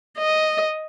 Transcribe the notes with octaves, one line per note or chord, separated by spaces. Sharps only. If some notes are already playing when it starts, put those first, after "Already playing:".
D#5